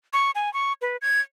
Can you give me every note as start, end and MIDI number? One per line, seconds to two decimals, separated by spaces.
0.13 0.31 85
0.35 0.52 80
0.54 0.73 85
0.82 0.97 71
1.02 1.20 92